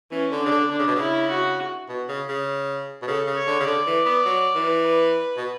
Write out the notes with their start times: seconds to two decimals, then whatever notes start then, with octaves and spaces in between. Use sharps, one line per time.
0.12 E3 C#4
0.31 D3
0.41 D4
0.46 C#3
0.51 D3
0.70 D3 D4
0.79 C#3
0.87 B2
0.96 C#3 E4
1.30 F#4
1.89 B2
2.09 C#3
2.29 C#3
3.02 B2
3.07 C#3 A4
3.27 C#3
3.37 C#5
3.47 D3
3.60 C#3
3.67 D3 D5
3.87 E3
4.06 B3
4.26 F#3
4.55 E3
4.86 B4
5.37 B2